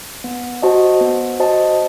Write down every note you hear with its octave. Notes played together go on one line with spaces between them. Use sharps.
B3
F#4 C5 D#5 A5
B3
F#4 C5 D#5 A5